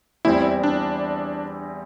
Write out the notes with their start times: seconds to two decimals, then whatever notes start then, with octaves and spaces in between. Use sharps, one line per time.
0.25 E2 E3 G3 C4 E4
0.63 D4